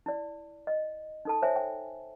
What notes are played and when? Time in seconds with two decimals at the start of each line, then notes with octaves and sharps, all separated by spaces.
0.06 E4 D5
0.67 D#5
1.25 D#4 A4 A5
1.42 C5 C#5 E5 G#5
1.56 G5